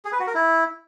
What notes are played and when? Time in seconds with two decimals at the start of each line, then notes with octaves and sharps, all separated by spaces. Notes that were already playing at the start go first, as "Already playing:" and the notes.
0.05 G#4
0.12 B4
0.20 F#4
0.27 A#4
0.35 E4